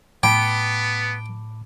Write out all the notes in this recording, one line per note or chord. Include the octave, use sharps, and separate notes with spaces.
A2 B3 G5 A5 B5 D6